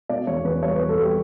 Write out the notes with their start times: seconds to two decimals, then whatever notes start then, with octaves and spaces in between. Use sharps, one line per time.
0.09 B2 D5
0.27 E2 C#5
0.44 E2 B4
0.62 G3 C#5
0.75 B2 B4
0.89 A4
0.98 G3 G4